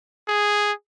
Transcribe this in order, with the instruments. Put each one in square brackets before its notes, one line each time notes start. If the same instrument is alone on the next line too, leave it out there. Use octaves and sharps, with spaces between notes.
[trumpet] G#4